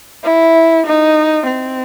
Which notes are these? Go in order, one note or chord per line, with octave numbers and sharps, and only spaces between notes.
E4
D#4
C4